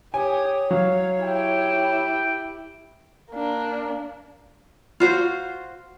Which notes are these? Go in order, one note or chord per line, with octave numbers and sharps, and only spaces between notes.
G4 C#5 G#5 D#6
F#3 F5
E4 G4 G5
A#3 D4
F4 F#4 C5